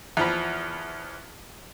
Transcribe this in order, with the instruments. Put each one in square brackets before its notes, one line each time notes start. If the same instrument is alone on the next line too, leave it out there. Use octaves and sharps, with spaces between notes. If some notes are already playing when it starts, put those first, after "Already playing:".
[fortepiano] E2 F3 B5